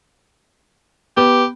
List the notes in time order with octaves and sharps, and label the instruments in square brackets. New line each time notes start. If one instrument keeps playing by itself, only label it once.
[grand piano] B3 [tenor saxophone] G4